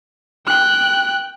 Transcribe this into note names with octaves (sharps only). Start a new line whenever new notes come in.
G5 F#6